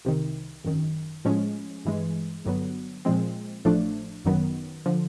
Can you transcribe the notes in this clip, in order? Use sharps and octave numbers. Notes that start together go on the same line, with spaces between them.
C2 C3 D#3
G#1 F#2 D#3
A2 F3 G#3 C#4
G2 E3 G#3
G1 G2 D3 F#3 B3
A#2 F3 G#3 C4
A1 A2 F3 A3 D4
G#1 F#2 D#3 F#3 B3
D3 F3